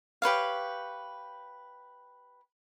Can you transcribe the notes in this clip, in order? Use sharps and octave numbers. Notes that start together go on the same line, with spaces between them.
G4 B4 C#5 F5